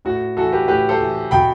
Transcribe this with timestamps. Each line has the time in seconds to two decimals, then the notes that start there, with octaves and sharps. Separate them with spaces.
0.05 A2 F#4
0.37 E3 F#4 A4
0.52 G4 B4
0.68 A2 G4 B4
0.89 A4 C5
1.01 E3
1.31 B2 G5 B5